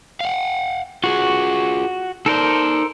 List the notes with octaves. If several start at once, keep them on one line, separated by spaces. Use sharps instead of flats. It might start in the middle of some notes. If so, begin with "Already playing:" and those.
F5 F#5
F4 F#4 G#4
D#4 A4 A#4 C5 D5